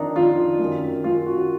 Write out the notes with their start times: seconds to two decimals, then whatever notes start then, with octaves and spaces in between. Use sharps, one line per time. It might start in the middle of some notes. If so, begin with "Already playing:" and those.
Already playing: F2 D#3 D4 D#4
0.15 F2 D#3 F4
0.59 F#2
0.65 D#3
1.04 F#2 D#3 F4
1.26 F#4